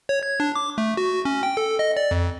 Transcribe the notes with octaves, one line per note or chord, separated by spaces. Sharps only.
C#5
G#6
D4
D6
A3
F#4
C#4
G5
A4
D#5
D5
F2